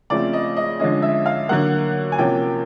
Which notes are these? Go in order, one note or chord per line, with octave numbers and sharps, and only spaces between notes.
C#3 F3 A3 C4 D5
D#5
D#5
D3 F3 G#3 C#4 D#5
E5
F5
D3 F#3 A#3 F#5
G#5
C3 F3 A#3 C#4 G5